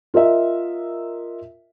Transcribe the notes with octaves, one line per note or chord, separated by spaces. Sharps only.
F4 A#4 D#5 E5